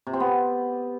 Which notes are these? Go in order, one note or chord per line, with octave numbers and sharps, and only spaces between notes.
C3
C4
B3